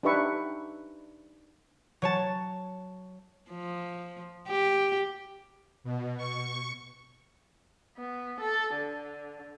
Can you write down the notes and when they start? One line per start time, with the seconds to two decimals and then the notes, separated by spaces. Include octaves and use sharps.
0.03 D4 D#4 G4 B4 E5 C#6
2.02 F#3 C#5 A5
3.52 F3
4.48 G4
5.84 B2
6.17 C#6
7.97 B3
8.40 A4
8.74 D3